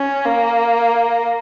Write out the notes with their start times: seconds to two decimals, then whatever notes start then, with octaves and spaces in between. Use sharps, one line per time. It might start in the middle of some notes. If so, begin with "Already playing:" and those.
Already playing: C#4
0.25 A#3